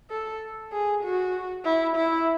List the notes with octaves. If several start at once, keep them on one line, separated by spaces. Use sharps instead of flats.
A4
G#4
F#4
E4
E4